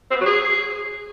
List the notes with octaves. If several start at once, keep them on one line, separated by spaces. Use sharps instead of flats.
C4
B3
F#3
G#4